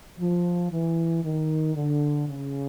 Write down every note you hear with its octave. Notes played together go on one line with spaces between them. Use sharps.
F3
E3
D#3
D3
C#3